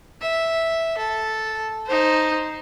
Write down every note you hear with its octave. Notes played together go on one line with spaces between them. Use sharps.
E5
A4
D#4 C5